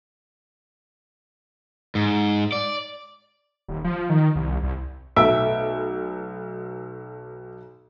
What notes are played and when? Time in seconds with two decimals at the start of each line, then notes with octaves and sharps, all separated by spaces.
1.95 G#2
2.52 D5
3.68 D#1
3.84 F3
4.10 D#3
4.36 C2
4.63 C2
5.16 B1 A3 E5 D7